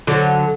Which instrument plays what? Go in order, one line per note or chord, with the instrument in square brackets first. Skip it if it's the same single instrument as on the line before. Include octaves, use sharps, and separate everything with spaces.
[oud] D3 F#3